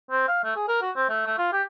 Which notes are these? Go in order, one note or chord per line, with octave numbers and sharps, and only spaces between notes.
C4
F5
A3
G#4
A#4
F#4
C4
A3
A3
F4
G4